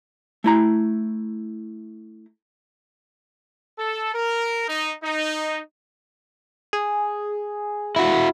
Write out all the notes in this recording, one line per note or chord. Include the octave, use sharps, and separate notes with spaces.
A3 E4 A#5
A4
A#4
D#4
D#4
G#4
E4 F#4